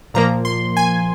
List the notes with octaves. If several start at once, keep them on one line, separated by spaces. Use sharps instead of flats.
A#2 F3 A#3 A#5
C6
G#5